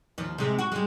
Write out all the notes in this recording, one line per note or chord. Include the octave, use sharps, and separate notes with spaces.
D#2 F3
C3 G#3
F#4
G3 G#3